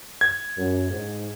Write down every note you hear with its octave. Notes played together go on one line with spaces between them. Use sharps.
G#6
F#2
G#2